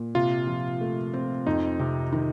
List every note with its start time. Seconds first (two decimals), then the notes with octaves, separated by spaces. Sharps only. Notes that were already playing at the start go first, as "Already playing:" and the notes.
Already playing: A#2
0.15 C3 F4
0.47 F3
0.81 A3
1.14 C4
1.47 F2 D#4
1.79 C3
2.12 D#3